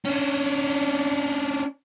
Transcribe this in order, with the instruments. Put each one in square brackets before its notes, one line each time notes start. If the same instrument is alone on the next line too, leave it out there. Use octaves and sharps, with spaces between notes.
[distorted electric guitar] C#4 D4